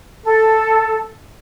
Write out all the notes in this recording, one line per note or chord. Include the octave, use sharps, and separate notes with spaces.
A4